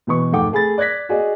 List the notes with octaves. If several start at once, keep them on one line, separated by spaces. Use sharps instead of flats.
B2 E3 B4 C#6
F1 G#2 A3 F#5 G5 D6
A3 G#4 B5 A6
D5 F#6 G#6 A#6 B6
F#4 G#4 D5 D#5